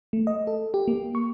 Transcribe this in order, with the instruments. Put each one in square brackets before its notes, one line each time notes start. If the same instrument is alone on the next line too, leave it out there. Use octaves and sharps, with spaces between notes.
[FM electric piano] A3
D#5
A4
G4
A#3
C#6